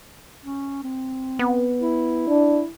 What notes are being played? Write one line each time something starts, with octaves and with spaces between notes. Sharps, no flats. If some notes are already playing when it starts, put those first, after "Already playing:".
C#4
C4
B3
E4
D4